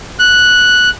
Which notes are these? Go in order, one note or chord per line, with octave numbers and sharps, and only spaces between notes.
F#6